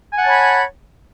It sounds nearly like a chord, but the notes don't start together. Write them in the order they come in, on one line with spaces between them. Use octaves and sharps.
G#5 F#5 A5 C#5 B5